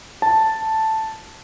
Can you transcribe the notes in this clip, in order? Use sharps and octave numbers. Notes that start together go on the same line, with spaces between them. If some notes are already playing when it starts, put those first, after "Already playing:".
A5